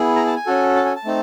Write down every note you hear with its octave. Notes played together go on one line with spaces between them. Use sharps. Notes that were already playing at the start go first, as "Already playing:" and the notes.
Already playing: B3 E4 G#4
A#5
A5
G#5
C#4 F#4 A4
A5
G#5
A5
A3 C4 D#4